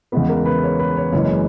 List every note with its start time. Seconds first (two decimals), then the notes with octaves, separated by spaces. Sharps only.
0.12 E2 C#3 G#3 B3 B4
0.29 A#4
0.45 B4
0.63 C#5
0.79 B4
0.97 C#5
1.12 F#1 F#2 E3 G#3 C#4 C#5